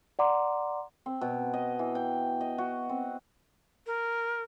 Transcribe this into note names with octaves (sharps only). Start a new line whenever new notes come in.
D5 F#5 A#5 C6 D6
C4
B2
D#5
E3
G5
D#5
F#4
C4
A#4